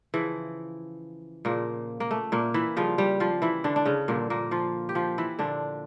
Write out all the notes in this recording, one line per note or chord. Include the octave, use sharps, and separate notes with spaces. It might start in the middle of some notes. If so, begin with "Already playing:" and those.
C#3 E3 F3 E4
A#2 C#3 F3 A#3
A#3
A3
A#2 A#3
E3 E4
C#3 F3 G3 F4
G3 G4
F3 F4
E3 E4
D3 D4
D4
C#3 C#4
G2 A#2 D3 F3 A#3
A#2 A#3
F3 F4
G4
F3 F4
E3 E4
A#2 D3 F3 D4